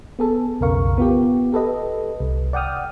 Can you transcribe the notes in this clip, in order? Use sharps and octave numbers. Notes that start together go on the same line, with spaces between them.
B3 G#4 A4
B1 F2 C#3 A#4 F5 C#6
B3 F4 G4
G4 A4 B4 D#5
C2
D5 F#5 G5 D#6 F6